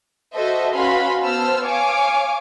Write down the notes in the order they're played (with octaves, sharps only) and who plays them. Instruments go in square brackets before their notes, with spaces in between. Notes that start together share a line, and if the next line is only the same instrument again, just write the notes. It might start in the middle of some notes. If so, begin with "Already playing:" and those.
[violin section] F#4 A4 C5 D#5 E5 A5
C#4 F#4 B4 F5 B5 C6
B3 C5 A5 E6 F6
C#5 F5 G#5 D6